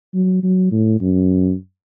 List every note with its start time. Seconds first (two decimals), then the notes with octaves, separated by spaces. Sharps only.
0.14 F#3
0.43 F#3
0.71 A2
1.01 F#2